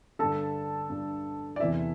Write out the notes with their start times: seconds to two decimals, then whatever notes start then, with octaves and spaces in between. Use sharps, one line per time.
0.19 G2 D3 A4 A5
0.90 G2 D3
1.56 D5
1.59 E2 C3 E3 E4 E5